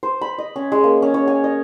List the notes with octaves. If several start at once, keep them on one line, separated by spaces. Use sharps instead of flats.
C5
B5
D#5
C#4
G#3
A#3
C#4
C#5
G#5
D#5